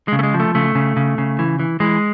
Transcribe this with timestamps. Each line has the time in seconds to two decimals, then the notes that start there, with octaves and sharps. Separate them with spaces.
0.08 C#3 G#3
0.19 A3
0.23 G#3
0.34 F3
0.40 A3
0.55 C#3 A3
0.75 C#3
0.97 C#3
1.18 C#3
1.39 E3
1.59 E3
1.80 E3 G#3